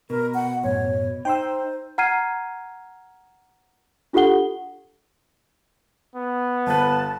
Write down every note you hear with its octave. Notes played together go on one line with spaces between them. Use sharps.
B2 A#4
F#5
F#2 A2 C#5
D#4 C5 G5 C6 E6
F#5 A#5 F6 G#6 C7 D#7
D4 F4 G4 A4 F#5 G7
B3
G1 B4 A5